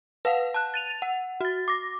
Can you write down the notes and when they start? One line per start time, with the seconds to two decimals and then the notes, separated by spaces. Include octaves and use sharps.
0.25 B4 F5 F#5
0.54 A5 F#6
0.74 A6 D#7 F7
1.02 F#5
1.41 F#4 A6
1.68 D6 A#6